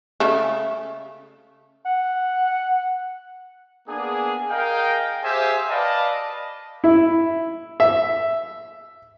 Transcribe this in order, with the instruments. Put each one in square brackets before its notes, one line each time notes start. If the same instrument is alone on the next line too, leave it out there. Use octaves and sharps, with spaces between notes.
[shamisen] C#3 A3
[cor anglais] F#5
[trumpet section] A#3 B3 D4 G#4
G#4 A#4 D#5 F5 G5
G4 G#4 C5 E5 F5 G#5
B4 D5 D#5 F5 A5
[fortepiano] E4
E5